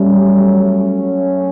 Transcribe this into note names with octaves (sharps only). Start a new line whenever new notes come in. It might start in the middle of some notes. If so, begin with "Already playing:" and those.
Already playing: F#3 G3 A3 C#4 F#4